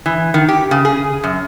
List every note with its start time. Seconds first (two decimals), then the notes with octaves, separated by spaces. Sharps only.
0.06 E3
0.34 D#3
0.49 G4
0.71 C#3
0.85 G#4
1.24 F#2